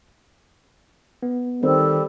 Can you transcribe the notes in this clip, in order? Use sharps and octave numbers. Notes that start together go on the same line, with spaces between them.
B3
D#3 G3 C4 A4